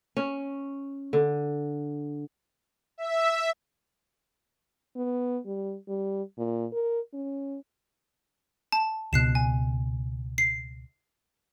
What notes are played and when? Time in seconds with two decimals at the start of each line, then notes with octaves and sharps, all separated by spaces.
0.17 C#4
1.13 D3
2.98 E5
4.96 B3
5.46 G3
5.88 G3
6.38 A#2
6.73 A#4
7.14 C#4
8.72 A5
9.13 C#2 B2 F#6 C7 E7
9.35 G#5
10.38 C7